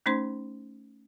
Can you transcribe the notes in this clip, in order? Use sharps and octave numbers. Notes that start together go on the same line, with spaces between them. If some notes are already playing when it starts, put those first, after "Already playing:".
A3 C#4 D#4 C5 C6